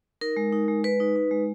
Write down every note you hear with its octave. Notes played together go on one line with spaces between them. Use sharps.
D#4 A#4
G#3
D#4
G#3
G#3 B4
D#4
D#4
G#3